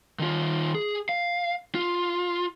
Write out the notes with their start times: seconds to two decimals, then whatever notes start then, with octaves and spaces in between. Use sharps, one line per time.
0.19 D#3 F4
0.75 G#4
1.09 F5
1.75 F4